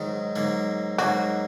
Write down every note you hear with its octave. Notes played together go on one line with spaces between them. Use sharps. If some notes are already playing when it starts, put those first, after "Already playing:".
Already playing: G#2 D#3 F#3
G#2 F#3 A#3
G#2 F#3 A#3 F#4